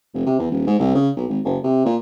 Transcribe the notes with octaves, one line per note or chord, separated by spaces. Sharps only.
F1
C3
E2
D#1
G#2
C2
C#3
B1
G#1
F#1
C3
A#2